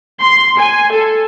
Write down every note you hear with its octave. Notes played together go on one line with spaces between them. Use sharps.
C6
G#5
A4